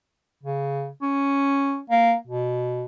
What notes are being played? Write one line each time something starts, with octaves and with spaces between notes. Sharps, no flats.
C#3
C#4
A#3
B2